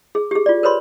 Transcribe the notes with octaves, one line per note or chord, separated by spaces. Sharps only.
G#4
G4 G#4
F4 D5
A#4 B4 C#5 B5 C6